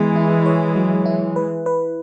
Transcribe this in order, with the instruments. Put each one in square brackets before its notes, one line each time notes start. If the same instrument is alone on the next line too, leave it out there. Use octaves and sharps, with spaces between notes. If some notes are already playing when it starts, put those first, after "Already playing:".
Already playing: [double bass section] E3 G#3 [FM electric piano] B3 G#4
[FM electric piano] E4
C#5
F#3
E4
B4
B4